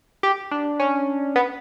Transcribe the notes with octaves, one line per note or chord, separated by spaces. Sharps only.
G4
D4
C#4
B3